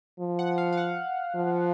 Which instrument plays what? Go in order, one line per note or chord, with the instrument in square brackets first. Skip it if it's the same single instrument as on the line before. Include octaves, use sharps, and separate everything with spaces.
[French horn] F3
[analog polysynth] F#5
F5
F5
F#5
[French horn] F3